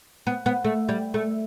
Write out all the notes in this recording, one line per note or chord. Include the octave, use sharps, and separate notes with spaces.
B3
B3
A3
G3
A3